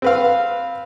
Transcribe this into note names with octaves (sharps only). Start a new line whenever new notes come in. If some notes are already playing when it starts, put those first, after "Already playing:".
C4 B4 F5